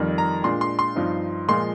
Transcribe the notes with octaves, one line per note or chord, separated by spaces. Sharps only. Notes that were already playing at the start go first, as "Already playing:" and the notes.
Already playing: F2 D#3 G3
A#5
A#2 G#3 D4 C6
C6
C6
G2 F3 C4 D#4
A#2 F3 G#3 C6